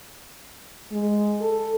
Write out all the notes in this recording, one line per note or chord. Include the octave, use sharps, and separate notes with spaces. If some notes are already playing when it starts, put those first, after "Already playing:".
G#3
A4